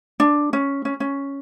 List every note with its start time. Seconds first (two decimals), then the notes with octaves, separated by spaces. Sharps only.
0.20 D4
0.53 C#4
0.85 C#4
1.00 C#4